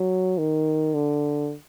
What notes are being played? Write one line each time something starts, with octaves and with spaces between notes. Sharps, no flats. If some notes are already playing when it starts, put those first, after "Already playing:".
Already playing: F#3
D#3
D3